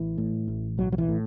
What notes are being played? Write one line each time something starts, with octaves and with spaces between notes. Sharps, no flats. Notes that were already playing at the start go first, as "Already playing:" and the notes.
Already playing: A1 E3
A2
A1
B1 F#3
F#3
E3
A2